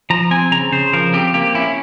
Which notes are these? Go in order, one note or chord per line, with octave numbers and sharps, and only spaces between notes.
F3 A#5
C4 G#5
C#3 A#5
C#3 C5
F3 A#4
C4 G4
A#3 G4
C#4 E4